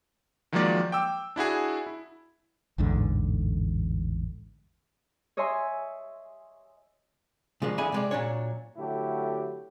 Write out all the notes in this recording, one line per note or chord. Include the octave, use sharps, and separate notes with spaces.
D#3 F3 F#3 G#3 A#3 D5
G5 D6 E6
D4 E4 F#4 G#4
E4
A1 E2 G#2 D3
C#5 D#5 E5 G#5 C6
C#3 F3 F#3 G#3 A#3 D4
E2 D3 G#4 E5 G#5 B5
C3 G#3 D5
A#2 F#3 D4 C#5
D3 F#3 A3 E4 G4